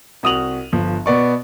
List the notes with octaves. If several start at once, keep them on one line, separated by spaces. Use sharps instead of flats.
C2 F#4 D#6 D#7 F7 F#7
G1 F3
B2 B3 D5 C#6